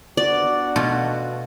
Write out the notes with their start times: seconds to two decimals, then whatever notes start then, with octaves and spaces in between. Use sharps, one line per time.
0.17 B3 D4 F#4 D5
0.76 B2 A3 F4